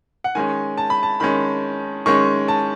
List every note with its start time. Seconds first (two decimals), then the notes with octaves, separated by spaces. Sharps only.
0.24 F#5
0.35 D#3 G#3 C#4 G#5
0.78 A5
0.90 B5
1.03 A5
1.20 D#3 G#3 C#4 B5
2.06 D#3 G#3 C#4 C#6
2.48 A5